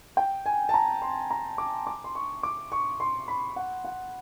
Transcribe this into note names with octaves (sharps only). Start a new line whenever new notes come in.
G5
G#5
A5
A#5
C6
A#5
D6
D6
C6
C#6
D6
C#6
C6
B5
F#5
F#5